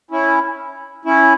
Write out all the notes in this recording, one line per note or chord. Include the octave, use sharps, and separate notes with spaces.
C#4 E4
C#4 E4